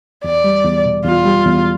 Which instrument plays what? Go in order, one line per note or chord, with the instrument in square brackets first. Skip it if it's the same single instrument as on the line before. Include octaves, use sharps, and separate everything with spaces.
[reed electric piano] E2 [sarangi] D5
[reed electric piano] G3
E2
B2
[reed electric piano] E2 [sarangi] F4
[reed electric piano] G3
E2